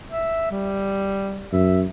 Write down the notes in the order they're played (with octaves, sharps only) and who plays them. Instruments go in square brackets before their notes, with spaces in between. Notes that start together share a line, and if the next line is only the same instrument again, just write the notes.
[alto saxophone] E5
G3
[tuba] F#2 [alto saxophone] E5